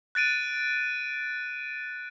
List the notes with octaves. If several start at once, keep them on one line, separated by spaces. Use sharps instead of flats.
F#6 A6 D7 D#7